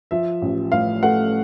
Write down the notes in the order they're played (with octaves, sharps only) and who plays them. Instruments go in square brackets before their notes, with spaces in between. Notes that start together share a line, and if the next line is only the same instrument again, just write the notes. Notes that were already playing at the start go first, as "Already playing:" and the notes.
[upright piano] F3 E5
A1
A2 F5
A3 F#5